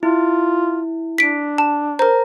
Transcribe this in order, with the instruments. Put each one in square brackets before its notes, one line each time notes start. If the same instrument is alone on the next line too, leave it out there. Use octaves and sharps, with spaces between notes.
[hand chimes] E4 [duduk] F4
[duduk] D4 [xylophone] B6 D7
[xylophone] A5
[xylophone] A#4 C5 [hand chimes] A#5